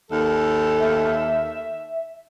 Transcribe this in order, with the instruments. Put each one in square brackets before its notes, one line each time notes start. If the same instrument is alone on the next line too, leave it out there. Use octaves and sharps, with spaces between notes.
[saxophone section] D#2 A4
[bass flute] E5